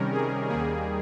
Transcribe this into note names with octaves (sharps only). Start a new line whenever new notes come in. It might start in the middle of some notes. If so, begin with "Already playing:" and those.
Already playing: C3 D#3 G3 C#4 A#4
G#4
D#2 D#3 G3 A#3 G#4